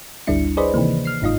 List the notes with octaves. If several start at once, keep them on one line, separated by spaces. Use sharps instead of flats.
G#1 D2 G3 D4 E4 C#7
G#4 B4 C5 D5 D#5 B5
C3 D#3 E3 A#3
F6 C7
G1 G#2 D#4 F4 D#5